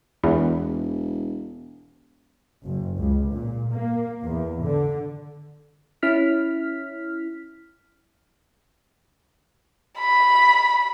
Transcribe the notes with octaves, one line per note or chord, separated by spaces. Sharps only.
E1 E2
F#1
C#2
A#2
A#3
E2
D3
C#4 E4 F6 B6
B5